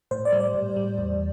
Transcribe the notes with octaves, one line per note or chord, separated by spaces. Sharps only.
A2 C5
D5
G3
D5
A2
G3
E2